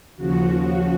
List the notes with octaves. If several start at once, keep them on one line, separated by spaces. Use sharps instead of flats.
D#2 C#3 F3 F#4